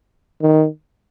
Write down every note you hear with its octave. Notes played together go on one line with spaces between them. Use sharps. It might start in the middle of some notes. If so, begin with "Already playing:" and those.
D#3